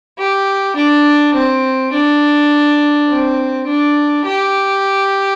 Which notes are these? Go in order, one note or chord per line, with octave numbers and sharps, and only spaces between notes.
G4
D4
C4
D4
C4
D4
G4